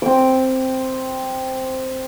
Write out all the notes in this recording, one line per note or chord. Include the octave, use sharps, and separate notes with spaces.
C4 D6